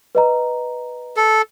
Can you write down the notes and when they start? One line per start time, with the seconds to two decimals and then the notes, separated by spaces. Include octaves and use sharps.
0.15 B4 D#5 A#5
1.17 A4